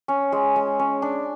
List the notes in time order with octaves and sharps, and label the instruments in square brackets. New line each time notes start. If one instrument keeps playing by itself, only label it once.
[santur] C#4
G#3
G#3
C#4
D4